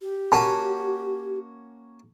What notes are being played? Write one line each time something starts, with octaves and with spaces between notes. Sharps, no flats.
G4
A#3 C#4 F#4 A5 B5